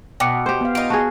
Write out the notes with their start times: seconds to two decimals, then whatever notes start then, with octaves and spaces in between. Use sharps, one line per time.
0.20 B2 G5 D6 C#7
0.46 G4 C5
0.61 B3 F5
0.75 D#4 F4 D7
0.90 F#4 G#4 A5